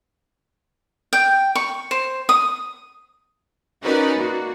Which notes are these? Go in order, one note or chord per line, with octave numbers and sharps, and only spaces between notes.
G5
C#6
C5
D#6
C#4 D#4 F#4 A#4 B4 D5
A#3 F#4